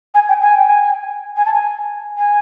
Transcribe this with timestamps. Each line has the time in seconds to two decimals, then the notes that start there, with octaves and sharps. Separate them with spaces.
0.14 G#5
0.29 G5
0.42 G#5
0.56 G5
0.69 G#5
1.37 G#5
1.46 A5
1.54 G#5
2.18 G#5